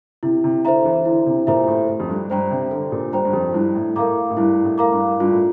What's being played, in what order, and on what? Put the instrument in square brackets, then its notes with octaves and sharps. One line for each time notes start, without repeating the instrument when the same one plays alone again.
[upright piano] C3 [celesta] E4
[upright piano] C3
[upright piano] D3 [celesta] A4 C5 E5 A#5
[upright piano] E3
[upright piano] D3 [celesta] E4
[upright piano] C3
[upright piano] A#2 [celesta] A4 C5 E5 A#5
[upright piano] A2
[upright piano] A2 [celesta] A4
[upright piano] F2
G2
[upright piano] G2 [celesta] C5 G5 A#5
[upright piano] C3
[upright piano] D3 [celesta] A4
[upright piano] A#2
[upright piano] G2 [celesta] C5 G5 A#5
[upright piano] G2
F2
[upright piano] G2 [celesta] E4
[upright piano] A2
[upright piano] A2 [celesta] A#4 F5 A#5 D6
[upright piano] A2
[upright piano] G2 [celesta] E4
[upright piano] A2
[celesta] A#4 F5 A#5 D6
[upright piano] G2
[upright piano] G2 [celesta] F4
[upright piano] A2